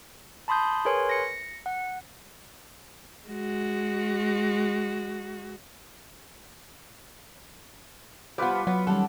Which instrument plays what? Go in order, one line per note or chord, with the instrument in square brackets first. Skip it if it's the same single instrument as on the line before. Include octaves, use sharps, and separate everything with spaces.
[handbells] A5 B5 C6 D#6 G6
G#4 A#4 B4 C#5 G#5 C6
A#6 C#7
F#5
[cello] G#3 F#4
[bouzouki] F3 B3 [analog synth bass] G3 [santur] F4 B4 D5
[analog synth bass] F#3 [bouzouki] B3
[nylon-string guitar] D#3 G3 C#4 [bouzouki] A4 [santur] F#5